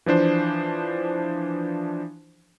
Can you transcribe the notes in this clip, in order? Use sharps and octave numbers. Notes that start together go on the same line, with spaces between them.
E3 F3 D4 C5